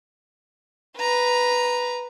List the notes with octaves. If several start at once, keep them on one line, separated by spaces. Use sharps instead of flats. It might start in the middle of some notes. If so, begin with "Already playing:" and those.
B4 A#5